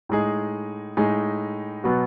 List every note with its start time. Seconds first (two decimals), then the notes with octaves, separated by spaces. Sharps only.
0.09 A2 G#3 D#4 G#4
0.97 A2 G#3 D#4 G#4
1.84 B2 F#3 B3 F#4